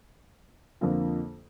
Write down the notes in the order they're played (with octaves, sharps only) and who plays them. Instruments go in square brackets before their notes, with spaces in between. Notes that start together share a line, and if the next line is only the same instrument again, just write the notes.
[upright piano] F2 D3 F3 A#3